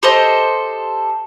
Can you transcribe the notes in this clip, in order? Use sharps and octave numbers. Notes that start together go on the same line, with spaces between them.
G4 A4 C5 D#5